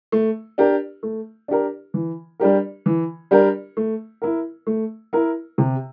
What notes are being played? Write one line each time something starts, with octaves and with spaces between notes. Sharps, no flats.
A3
D4 G4 A#4
A3
D4 G4 A#4
E3
G3 D4 G4 A#4
E3
G3 D4 G4 A#4
A3
E4 A#4
A3
E4 A#4
C3